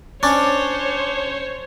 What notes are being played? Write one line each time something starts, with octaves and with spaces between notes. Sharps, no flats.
C#4 D4 C5 C#5